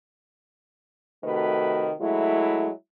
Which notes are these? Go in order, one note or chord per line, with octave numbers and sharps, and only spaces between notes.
C3 D#3 A3 F#4 B4
F#3 G#3 A3 E4